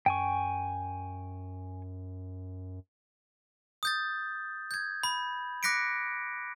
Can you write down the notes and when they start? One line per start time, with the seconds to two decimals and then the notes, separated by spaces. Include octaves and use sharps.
0.06 F#2 G5 G#5 C#6
3.83 D#6 G6 A6
4.71 G6 G#6
5.03 B5
5.63 D6 F#6 A#6 B6 C#7 D7